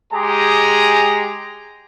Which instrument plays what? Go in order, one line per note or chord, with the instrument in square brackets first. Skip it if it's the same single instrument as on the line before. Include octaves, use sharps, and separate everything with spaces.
[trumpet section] G#3 G4 G#4 A#5